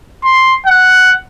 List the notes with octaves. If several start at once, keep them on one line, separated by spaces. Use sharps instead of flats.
C6
F#5